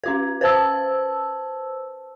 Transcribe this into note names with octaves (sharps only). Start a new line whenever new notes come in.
C#4 F4 B4
B4 C5 A5 E6